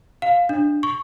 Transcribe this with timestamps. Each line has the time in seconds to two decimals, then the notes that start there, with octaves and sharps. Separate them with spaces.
0.22 F5
0.49 D4
0.83 C#6